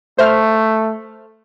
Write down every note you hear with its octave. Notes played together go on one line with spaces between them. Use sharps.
A3 C5 E5 F6